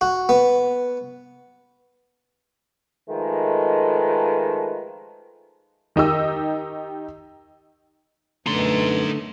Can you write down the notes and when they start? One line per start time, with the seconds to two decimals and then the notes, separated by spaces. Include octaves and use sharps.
0.01 F#4
0.29 B3
3.10 D#3 F3 G#3 A3 A4 B4
5.96 D#3 D#4 G4 E6
8.46 F#2 B2 D3 A3 C#4 D#4 C6